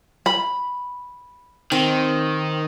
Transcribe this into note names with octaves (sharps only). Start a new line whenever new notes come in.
B5
D#3 C4